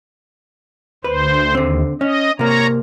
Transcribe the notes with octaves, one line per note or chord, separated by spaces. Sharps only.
D2 B4 C5
D#2 D3 C4
C#4 D#5
C3 A#3 C#5 A#5